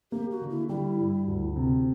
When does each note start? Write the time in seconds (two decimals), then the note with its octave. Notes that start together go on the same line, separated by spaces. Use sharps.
0.12 A#3 G4
0.31 F#4
0.42 D3
0.50 E4
0.69 G3 E4
0.98 G2
1.28 D2
1.56 C3